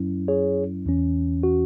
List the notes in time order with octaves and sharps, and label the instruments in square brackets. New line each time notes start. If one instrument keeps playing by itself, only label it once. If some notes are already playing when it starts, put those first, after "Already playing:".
Already playing: [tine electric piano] F#2 F#3 C#4 E4
G#4 C#5
E2 E3 C#4
F#4